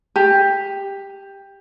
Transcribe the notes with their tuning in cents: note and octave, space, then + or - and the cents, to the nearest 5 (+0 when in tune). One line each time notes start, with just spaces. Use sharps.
G4 +10